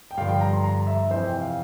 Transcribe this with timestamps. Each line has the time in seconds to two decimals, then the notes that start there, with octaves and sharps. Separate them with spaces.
0.11 G5
0.17 G2 D3 F3 F5
0.29 G5
0.41 A#5
0.53 C6
0.64 A#5
0.87 E5
1.10 F2 C3 E3 C5
1.26 G5
1.41 F5